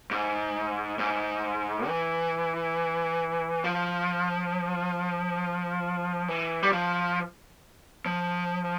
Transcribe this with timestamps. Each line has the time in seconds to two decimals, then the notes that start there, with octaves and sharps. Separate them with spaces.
0.11 G#2
0.99 G#2
1.87 E3
3.64 F3
6.28 E3
6.63 G3
6.72 F3
8.06 F3